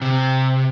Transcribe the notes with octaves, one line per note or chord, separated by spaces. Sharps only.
C3